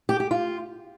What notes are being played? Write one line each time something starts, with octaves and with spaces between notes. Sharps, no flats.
G4
G4
F4